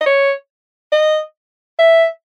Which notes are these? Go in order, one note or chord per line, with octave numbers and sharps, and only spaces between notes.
D#5
C#5
D#5
E5